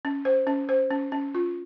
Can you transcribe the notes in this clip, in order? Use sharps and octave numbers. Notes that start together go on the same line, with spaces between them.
C#4
C5
C#4
C5
C#4
C#4
F4